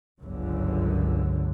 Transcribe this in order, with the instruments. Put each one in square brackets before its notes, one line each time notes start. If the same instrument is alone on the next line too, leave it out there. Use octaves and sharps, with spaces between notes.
[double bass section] G1 C#2 F#2 D3